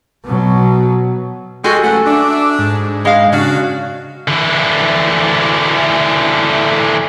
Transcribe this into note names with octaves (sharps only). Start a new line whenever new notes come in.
B2 F#3
G#3 F#4 G4 A4 G#5 C6
F#2 E3 A3 F#5
D4 D5 E5
G#2
G#3 F5
C#3 D4 F#4 F5
D3 E3